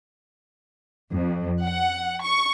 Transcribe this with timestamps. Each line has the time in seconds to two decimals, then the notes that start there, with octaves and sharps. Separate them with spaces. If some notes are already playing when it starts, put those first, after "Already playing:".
1.13 F2
1.62 F#5
2.21 C#6